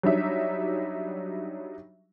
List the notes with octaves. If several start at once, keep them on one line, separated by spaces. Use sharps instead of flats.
F#3 G3 D4 D#4 E5